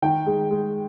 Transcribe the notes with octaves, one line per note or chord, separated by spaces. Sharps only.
D#3 G5
G#3
G#3